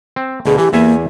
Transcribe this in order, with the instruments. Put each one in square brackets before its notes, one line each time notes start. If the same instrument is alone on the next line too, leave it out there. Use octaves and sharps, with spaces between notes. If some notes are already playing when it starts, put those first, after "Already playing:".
[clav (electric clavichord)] C4
[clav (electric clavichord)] D2 B2 [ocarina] G#4
[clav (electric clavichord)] E3 [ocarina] G4
[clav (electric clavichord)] E2 E5 G#5 [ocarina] A#3